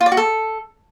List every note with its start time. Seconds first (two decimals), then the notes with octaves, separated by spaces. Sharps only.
0.01 F4
0.06 D5
0.12 F#4
0.17 A4